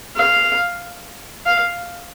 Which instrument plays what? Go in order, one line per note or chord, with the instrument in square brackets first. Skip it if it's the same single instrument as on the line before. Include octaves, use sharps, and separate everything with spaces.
[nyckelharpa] F5
F5